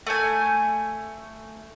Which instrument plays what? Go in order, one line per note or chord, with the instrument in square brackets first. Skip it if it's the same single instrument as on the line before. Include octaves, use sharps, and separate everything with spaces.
[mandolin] A3 G#5